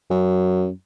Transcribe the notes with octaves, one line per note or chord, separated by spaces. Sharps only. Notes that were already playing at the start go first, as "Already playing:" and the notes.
F#2